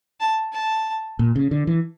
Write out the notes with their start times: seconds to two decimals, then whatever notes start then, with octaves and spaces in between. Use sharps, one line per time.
0.20 A5
0.53 A5
1.19 A#2
1.36 C#3
1.51 D3
1.67 E3